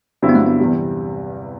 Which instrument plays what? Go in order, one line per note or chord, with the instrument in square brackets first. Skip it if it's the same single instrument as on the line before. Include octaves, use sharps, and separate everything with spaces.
[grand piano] G2 D3 F#3 C4 E4
[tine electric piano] B3
A3
B3
[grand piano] E2 C3 G3